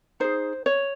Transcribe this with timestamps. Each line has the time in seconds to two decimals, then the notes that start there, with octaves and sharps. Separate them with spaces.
0.20 D#4 G#4 C5
0.66 C#5